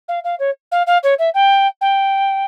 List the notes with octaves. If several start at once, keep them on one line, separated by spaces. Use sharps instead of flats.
F5
F5
C#5
F5
F5
C#5
E5
G5
G5